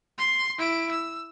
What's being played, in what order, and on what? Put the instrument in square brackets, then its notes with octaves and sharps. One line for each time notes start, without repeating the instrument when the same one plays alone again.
[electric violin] C6
E4 D7
E6